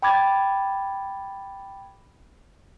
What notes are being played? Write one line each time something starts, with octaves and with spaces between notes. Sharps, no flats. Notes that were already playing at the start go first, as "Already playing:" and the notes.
G5 B5 D6 G#6 A6